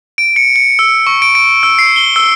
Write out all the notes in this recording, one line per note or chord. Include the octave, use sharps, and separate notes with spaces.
D7
C#7
C#7
E6
C#6
D7
D7
E6
C7
G7
E6